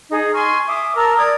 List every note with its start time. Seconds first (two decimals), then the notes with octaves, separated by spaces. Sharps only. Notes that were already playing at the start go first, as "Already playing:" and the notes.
0.10 D#4 G#4
0.33 G#5 C6 C#6 F6
0.67 E5 D6 D#6
0.96 A#4 A5 A#5 E6
1.17 D5 D#6 G#6